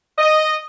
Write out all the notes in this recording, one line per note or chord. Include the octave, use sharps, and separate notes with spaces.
D#5